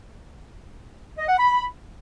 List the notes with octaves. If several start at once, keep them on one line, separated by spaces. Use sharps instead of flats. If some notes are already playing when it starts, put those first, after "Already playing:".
D#5
F#5
B5